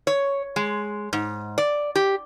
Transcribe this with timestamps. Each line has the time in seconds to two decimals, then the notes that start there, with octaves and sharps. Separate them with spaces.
0.07 C#5
0.56 G#3
1.13 G#2
1.58 D5
1.95 G4